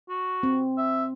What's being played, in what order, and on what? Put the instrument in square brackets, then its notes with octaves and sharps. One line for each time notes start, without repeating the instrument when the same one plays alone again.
[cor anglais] F#4
[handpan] C4
[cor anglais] E5